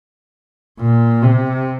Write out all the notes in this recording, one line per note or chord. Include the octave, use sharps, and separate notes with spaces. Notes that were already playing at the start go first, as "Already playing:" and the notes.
A#2
C3